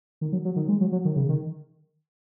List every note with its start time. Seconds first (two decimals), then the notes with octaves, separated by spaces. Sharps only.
0.21 D#3
0.32 F#3
0.45 F#3
0.56 D#3
0.68 G#3
0.80 F#3
0.92 F#3
1.05 D#3
1.16 C#3
1.29 D#3